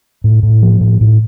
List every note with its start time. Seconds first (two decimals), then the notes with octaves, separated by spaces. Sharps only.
0.24 A2
0.43 A2
0.62 F3
0.81 A2
1.01 A2